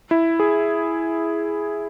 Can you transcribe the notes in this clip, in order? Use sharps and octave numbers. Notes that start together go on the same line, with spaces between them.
E4
G#4